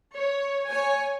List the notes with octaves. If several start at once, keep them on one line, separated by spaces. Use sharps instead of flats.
C#5
C#5 G#5